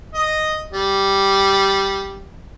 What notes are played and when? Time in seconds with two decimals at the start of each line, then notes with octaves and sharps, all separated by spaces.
0.14 D#5
0.73 G3